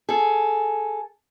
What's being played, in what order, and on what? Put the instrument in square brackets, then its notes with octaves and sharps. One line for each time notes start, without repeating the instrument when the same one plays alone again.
[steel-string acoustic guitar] G#4 A4